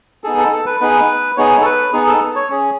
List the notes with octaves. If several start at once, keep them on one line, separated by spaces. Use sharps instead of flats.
B3 D#4 G#4 A4
A4
A4
B4
B3 D#4 G#4 B4
B3 D#4 G#4 C#5
A4
B4
B3 D#4 G#4
A4
C#5
C#4 G#4